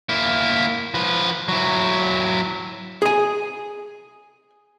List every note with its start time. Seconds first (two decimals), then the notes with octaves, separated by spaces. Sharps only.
0.09 A#3 E4
0.94 F3 B4
1.48 F#3 E4
3.02 G#4 G#5